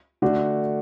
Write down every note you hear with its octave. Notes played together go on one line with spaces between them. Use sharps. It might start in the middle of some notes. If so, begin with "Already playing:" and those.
D3 A3 D4 F#4